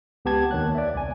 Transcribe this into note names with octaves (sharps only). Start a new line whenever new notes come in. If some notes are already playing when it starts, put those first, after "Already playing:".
C#2 B3 G4 A5 G#6
D#2 D#3 C#5 F#6
D5 E5
C2 G#5